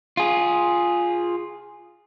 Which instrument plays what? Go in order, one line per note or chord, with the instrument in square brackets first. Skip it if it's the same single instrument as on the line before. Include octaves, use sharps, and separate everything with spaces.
[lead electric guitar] F4 G#4